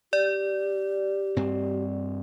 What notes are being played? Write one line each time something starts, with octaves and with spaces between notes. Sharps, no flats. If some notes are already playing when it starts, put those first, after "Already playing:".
G4 D5
G2 C4